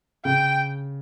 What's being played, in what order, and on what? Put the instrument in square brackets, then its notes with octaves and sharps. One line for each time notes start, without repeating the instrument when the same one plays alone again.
[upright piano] C#3 [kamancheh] G5